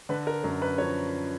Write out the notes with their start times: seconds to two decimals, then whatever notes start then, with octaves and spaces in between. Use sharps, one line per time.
0.09 D3 B4
0.27 A#4
0.44 F#2 A#4
0.62 B4
0.78 F3 C#5